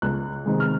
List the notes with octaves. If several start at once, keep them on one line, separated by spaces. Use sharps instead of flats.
C#2 F#6
C3 D#3 G#3
F6